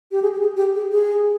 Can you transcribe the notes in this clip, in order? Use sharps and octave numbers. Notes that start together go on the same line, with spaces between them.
G4
G#4
G4
G#4
G4
G#4
G#4